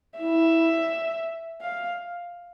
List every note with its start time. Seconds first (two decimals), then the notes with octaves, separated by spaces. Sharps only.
0.19 E4 E5
1.62 F5